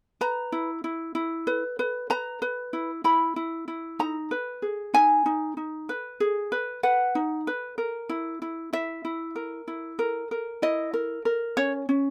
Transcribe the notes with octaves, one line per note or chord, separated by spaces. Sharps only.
B4 A#5
E4
E4
E4
B4
B4
B4 A#5
B4
E4
E4 B5
E4
E4
D#4 A#5
B4
G#4
D#4 G#5
D#4
D#4
B4
G#4
B4
B4 F#5
D#4
B4
A#4
E4
E4
E4 E5
E4
A#4
E4
A#4
A#4
E4 D#5
A#4
A#4
C#4 C#5
C#4